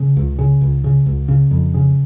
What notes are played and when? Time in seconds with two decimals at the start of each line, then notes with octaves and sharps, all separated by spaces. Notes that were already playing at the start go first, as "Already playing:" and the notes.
Already playing: C#3
0.17 C#2
0.39 C#3
0.61 C#2
0.84 C#3
1.06 C#2
1.28 C#3
1.51 F2
1.74 C#3